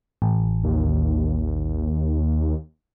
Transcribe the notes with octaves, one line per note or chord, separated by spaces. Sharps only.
A1
D#2